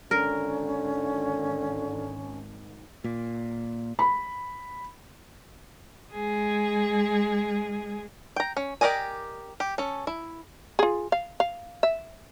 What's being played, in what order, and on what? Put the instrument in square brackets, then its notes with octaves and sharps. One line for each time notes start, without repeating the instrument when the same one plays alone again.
[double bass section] G#1 [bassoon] D3 [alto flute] C#4 [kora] A#4
[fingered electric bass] A#2
[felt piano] B5
[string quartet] G#3 G#4
[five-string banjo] G5 A#5
C#4
G4 A#4 D5 D#5 G#5
G4
C#4 A4
E4
[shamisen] F4 G#4
F5
F5
E5